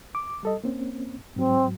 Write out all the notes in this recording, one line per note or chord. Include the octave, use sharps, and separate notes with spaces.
D6
G3 A4 D#5
A#3 C4 C#4
G#2 F#3 C4